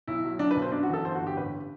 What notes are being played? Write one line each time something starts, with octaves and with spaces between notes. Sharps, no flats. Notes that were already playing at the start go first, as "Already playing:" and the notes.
B1 E4
F#3
F#3 D4
B4
B1
C5
F#2 D4
F#4
E3 A4
G1 C5
F#4
G1
G4
A1 B4